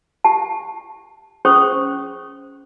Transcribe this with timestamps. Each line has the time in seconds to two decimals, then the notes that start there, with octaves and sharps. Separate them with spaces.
0.24 G4 A5
1.45 C#4 G#4 C5 C#6 D#6